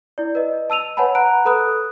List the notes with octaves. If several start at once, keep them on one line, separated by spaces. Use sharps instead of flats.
E4 D5
B4 D#5
A5 E6 D#7 F7
B4 C#5 F#5 G#5 A5 B5
F#5 A#5 F#6 D7
A4 B4 B5 D#6 F#6